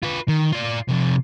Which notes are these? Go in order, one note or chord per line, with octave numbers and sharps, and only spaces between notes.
F4 B4
D#3
F4 D5
C3 F3